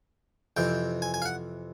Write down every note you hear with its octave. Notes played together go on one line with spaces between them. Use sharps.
F2 C3 E3 G5
G#5
G#5
F5
F#5